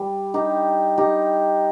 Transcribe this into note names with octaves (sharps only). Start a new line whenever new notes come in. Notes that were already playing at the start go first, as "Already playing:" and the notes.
Already playing: G3
D#4 G4
D#4 G4